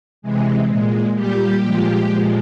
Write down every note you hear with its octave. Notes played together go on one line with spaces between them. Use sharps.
C3 E3 G#3
A#2 G#3
A#2 G3 G4
A#2 F3 G#3
A#2 F3 G#3